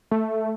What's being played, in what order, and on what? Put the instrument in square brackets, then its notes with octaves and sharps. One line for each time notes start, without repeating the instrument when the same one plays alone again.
[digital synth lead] A3